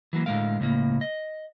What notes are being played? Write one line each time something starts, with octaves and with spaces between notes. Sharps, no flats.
E3 F#3 A#3
A2 D3 G#3 A#4 F5
C#2 A2 A#3
D#5